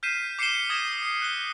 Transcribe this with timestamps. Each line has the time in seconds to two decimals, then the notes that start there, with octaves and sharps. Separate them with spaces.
0.03 F6 G6 B6 C7 D#7 E7
0.39 D6 C7 C#7 D#7 E7 G7
0.70 D#6 G#6 A#6 D#7 E7
1.03 C7
1.22 F#6 G7